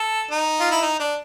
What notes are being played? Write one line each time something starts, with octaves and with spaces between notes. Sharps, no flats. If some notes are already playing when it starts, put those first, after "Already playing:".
Already playing: A4
D#4
F4
E4
D#4
D4